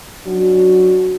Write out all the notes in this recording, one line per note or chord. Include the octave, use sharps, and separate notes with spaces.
F#3 C#4 D4 F#4